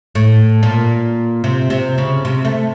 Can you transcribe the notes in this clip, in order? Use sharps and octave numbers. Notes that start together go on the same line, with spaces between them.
A2
A#2
C3
C3
C#3
C3
A3